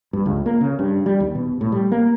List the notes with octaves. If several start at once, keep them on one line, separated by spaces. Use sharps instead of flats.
G2
C#2
A#3
C#3
G2
G3
D#2
B2
A2
G3
A#3